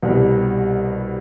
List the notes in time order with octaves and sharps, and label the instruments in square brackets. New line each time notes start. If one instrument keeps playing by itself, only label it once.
[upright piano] C2 B2 G3